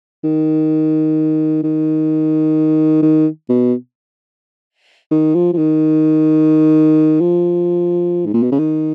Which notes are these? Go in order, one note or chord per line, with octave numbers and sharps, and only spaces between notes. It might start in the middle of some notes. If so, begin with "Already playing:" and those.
D#3
D#3
D#3
B2
D#3
F3
F3
D#3
F3
G#2
A#2
B2
C#3
D#3